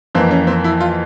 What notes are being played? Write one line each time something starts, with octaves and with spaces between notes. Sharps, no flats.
F2 E3 A#3 C4
C#4
C4
E4
F4